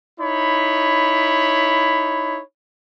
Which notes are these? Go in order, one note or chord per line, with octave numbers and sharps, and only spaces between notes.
D#4 E4 C#5 B5